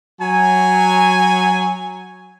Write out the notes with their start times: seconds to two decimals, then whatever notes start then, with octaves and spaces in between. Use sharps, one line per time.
0.21 F#3 G#5